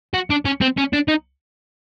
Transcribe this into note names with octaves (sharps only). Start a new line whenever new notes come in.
F#4
D4
C#4
C4
C#4
D4
D#4